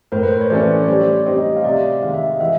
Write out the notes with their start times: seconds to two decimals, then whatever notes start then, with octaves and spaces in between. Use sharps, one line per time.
0.12 A2 A#4 C5
0.23 B4
0.32 C5
0.41 C#5
0.50 E3 A3 C#4 C5 D5
0.84 C#5
0.88 G3 C5 D5
1.26 C4 D#4 G4 C#5 D#5
1.56 F5
1.64 C3 D5 E5
2.02 D#3 G#3 F5
2.14 E5
2.24 D#5 F5
2.40 E3 E5 F#5